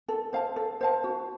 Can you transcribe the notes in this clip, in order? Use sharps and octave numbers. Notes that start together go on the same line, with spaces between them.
A4
C5 F5 A5
A4
C5 F5 A5
F#4